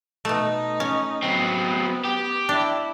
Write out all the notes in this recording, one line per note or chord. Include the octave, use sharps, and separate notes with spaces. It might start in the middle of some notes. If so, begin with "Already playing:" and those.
B2 A3 D#4
C#4
F#3 B3 C4
G4
D4 E4